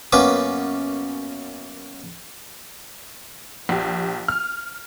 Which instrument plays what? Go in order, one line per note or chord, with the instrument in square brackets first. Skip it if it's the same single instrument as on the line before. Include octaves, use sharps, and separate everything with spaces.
[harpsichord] F#2 A#3 B3 C#4 B4 D6
[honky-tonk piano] A#1 G4
F6